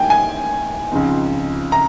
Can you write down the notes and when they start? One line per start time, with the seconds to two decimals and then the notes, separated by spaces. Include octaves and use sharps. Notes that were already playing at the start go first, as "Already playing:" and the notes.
Already playing: D#3 G3 A#3 G5 G#5
0.10 G#5
0.91 C#2 C#3 F3 C4 D#4
1.72 A#5